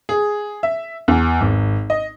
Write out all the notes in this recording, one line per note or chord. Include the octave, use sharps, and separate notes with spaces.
G#4
E5
E2
G#1
D#5